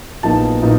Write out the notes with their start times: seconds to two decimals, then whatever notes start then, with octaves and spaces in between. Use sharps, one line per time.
0.23 A#1 A#2 F#3 B3 D#4 A5
0.62 A#2 F#3 B3 D#4